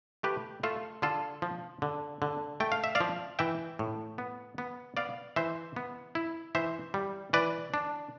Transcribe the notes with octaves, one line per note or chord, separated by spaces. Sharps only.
A3 G4 B4
A3 F4 A4
D3 F4 A4
F3
D3
D3
A3 G5
F5
E5
D5 F5
F3
E3 E5 G5
A2
B3
B3
B3 D5 F5
E3 C5 E5
B3
E4
E3 C5 E5
G3
E3 B4 D5
D4